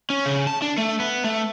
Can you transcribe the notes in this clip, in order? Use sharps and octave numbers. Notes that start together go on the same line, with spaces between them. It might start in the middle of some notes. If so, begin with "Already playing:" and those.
C#4
C#3
A5
D4
A3
B3
A3